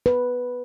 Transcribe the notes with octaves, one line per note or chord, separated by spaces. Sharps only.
B4